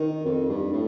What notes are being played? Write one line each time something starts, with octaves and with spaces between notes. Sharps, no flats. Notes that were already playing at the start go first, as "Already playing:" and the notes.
Already playing: D#3
F2
G2
A2